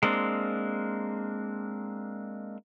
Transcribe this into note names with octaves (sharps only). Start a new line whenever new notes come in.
G#3 A#3 C4 D4